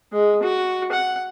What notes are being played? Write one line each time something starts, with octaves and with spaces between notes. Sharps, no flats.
G#3
F#4
F#5